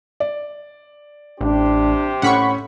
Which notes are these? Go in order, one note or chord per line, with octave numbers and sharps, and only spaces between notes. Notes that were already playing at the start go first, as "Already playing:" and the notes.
D5
A1 C3 D4 G4 C5
A2 C#4 F#5 B5 C#6